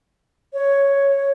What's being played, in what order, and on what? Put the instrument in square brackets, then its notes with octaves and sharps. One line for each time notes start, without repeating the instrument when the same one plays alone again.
[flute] C#5